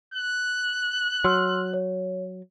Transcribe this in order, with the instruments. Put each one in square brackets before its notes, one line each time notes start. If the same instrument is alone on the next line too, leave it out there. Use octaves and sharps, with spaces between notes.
[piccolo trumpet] F#6
[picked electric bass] F#3 [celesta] C6 E6 F6
[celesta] C#5